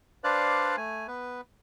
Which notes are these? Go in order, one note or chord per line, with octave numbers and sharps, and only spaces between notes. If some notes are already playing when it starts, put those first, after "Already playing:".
D4 B4 C5 D5 F5 F#6
A3 G#5
B3 B4